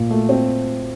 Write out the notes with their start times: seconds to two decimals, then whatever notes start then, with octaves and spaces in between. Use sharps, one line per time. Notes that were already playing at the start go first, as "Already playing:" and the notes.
Already playing: A#2
0.10 A3
0.29 C4